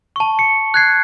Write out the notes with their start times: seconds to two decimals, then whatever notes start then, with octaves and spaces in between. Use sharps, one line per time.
0.16 A5 C#6
0.39 C#7
0.74 F#6 G#6 C7